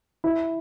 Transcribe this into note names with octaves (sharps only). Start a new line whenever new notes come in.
E4